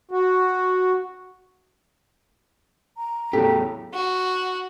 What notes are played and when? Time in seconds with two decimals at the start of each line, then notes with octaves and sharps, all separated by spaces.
0.11 F#4
2.97 A#5
3.33 E2 A2 C#3 F#3 G4 A4
3.94 F#4